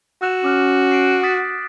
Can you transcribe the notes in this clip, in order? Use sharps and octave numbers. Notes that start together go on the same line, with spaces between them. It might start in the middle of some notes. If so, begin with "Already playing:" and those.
F#4 E6 F#6 E7
C#4 D6 F6 F#6
C7 D7
D#6 A6 B6